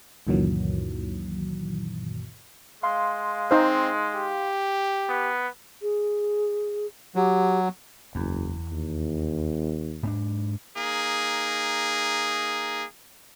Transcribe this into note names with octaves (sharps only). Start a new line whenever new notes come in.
C#2 F#2 A#2 D#3 E3 F#3
G#3 F5 C6
C4 D#4 C5
G4
B3
G#4
F#3 G4
F#1 E2
D#2
G#2 C4 D4
A#3 D#4 G#4